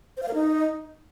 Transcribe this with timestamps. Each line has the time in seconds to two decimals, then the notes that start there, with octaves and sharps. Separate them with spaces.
0.17 C5
0.23 F5
0.28 A#4
0.34 D#4